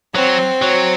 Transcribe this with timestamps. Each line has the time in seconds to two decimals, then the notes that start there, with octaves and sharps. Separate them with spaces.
0.14 F#3 C4
0.62 F#3